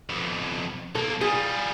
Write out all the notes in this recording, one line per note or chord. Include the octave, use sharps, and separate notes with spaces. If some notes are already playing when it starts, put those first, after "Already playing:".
F2 B2
B1 A#3 A4
F3 G3 G#4